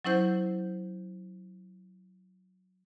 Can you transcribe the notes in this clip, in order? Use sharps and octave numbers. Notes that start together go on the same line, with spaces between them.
F#3 C#4 E4 C5 G6